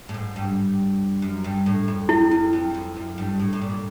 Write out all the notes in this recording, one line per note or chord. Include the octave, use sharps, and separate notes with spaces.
A2
G#2
G2
F#2
G2
A2
F2
F2 E4
F2
F2
F#2
F2
F#2
G2
A2
A2
A#2